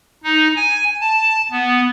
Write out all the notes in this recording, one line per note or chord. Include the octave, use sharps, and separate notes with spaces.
D#4
G#5
A5
B3